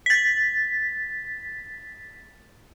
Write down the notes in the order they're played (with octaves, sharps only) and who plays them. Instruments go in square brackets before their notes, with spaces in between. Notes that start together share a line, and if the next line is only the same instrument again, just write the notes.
[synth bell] A6 B6